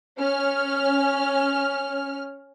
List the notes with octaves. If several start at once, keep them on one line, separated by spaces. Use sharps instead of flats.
C#4 F6